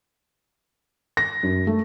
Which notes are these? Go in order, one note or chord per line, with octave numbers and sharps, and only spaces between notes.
A#6
F#2
A3